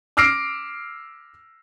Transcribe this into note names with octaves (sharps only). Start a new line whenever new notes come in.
D6 E6 F6 A#6 C7 D7